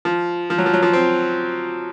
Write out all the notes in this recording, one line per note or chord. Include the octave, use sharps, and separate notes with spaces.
F3
F3
F#3
F3
F#3
F3
C4